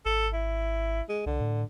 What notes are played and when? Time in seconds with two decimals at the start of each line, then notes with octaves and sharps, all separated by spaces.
0.06 G#1 A4
0.34 E4
1.09 G#3
1.26 C2 D3
1.40 A2